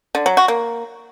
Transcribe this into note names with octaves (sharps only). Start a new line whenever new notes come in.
D3
F#3
F#4
A#3